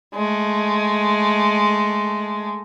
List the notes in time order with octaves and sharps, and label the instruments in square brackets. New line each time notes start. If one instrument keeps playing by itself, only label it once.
[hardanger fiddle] G#3 A3